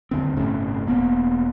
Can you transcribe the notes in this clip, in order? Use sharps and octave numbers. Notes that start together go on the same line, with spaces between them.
D#2 D3 C4
G1 A2 C3 C#4
E1 F2 A#3 B3